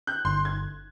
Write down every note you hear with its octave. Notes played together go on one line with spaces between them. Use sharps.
F#6 G6
G1 C6
G#6